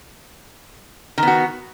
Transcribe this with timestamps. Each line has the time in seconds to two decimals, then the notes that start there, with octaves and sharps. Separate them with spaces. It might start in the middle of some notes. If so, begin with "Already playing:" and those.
1.18 D#3
1.23 B3
1.28 F#4